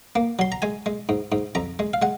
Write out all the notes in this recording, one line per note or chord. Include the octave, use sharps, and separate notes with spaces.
A#3
F#3 C6
A#5
G#3 G#5
G#3
G#2
G#2
F2 A#5
G#3
F5
G#3 F#5